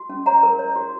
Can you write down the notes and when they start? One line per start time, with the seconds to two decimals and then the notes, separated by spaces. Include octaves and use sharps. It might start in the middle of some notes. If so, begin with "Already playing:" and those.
Already playing: F#4
0.09 C#4
0.26 C#5 F#5 A#5
0.43 A#4
0.59 C#5
0.76 F#4